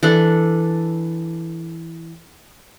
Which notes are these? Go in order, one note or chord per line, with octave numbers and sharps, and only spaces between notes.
E3 D4 A4